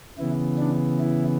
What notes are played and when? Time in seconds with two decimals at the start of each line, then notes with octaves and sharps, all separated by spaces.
0.18 C#3 E3 B3 E4
0.58 D4
1.00 E4